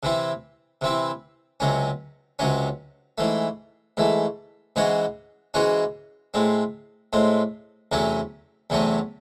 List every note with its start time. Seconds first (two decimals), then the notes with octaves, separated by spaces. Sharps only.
0.03 C3 E3 C4 E4
0.81 C3 E3 C4 E4
1.60 C#2 C3 F#3 C#4
2.39 C#2 C3 F#3 C#4
3.18 G#2 E3 A3
3.97 G#2 E3 A3
4.76 G#2 E3 G#3 C#4 F#4
5.54 G#2 E3 G#3 C#4 F#4
6.34 A2 G#3 C4
7.13 A2 G#3 C4
7.92 E2 C3 F#3 A3 C#4
8.70 E2 C3 F#3 A3 C#4